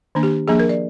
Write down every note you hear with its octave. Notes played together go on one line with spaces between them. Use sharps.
D#3 A#3 D4
G4
F3 A#3 D4 G#4
A#4
D5